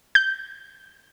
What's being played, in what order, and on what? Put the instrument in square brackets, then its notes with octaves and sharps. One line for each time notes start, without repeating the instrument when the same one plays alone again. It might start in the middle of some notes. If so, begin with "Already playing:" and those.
[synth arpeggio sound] G6